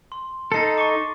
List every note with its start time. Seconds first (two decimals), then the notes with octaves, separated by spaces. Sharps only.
0.12 C6
0.52 D#4 A4 A6 C7 C#7
0.78 C#6 D6